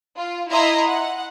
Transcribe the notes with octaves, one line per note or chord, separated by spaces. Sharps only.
F4
E4 D#5 E5 A#5 C6
F#5